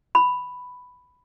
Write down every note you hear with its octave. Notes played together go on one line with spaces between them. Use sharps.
B5